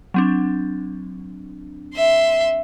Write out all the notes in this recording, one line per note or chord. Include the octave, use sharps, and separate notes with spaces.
F#3 C4 D4
E5 C6